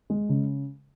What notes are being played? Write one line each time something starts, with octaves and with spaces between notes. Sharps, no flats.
G#3
C#3